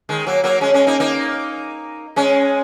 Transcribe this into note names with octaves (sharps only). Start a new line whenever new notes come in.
D#3 G#3
F#3 A#3
F#3 A#3
G#3 C#4
G#3 C#4
A#3 D#4
A#3 D#4
G#3 C#4